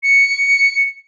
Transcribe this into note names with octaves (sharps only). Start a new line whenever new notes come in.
C#7